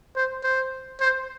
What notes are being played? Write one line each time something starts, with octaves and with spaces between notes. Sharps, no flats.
C5
C5
C5